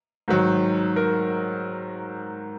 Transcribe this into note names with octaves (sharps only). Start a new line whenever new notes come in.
G#2 D#3 F#3
A#4